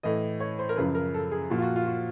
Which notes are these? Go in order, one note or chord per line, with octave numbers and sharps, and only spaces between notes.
A2 E3 D#5
C#5
C5
A#4
F#2 C#3 F3 B4
A#4
A4
G#4
A#2 F3 F#4
F4
F#4
F4
F#4